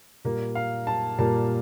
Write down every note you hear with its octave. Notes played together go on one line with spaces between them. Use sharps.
A#2 G3 A#3
F5
A5
A#2 G3 A#3 A5